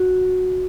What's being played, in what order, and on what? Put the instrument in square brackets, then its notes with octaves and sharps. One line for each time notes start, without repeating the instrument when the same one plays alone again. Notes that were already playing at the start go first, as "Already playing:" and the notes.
Already playing: [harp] F#4